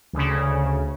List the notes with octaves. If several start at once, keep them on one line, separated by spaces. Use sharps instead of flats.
D2 C#3